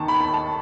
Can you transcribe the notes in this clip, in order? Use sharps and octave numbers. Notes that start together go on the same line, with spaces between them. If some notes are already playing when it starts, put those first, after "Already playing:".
Already playing: D#2 D#3 A5
B5
B5
A5